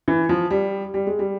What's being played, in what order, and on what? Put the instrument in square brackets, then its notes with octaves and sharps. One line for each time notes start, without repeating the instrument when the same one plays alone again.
[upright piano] E3
F3
G3
G3
G#3
G3